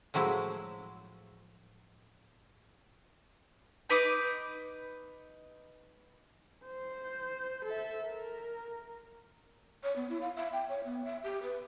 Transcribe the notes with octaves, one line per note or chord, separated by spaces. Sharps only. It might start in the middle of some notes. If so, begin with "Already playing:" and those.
A2 F3 F#3 G#3 E4
D#4 B4 D6 D#6
C5
A4 E5
A#4
C#5
B3
E4
F5
E5
G5
C#5
B3
E5
G4
B4